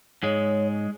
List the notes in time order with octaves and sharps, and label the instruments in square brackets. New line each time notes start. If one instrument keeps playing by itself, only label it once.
[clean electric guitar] G#2 G#3 [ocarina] C#5